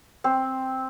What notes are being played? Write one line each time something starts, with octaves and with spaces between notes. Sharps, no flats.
C4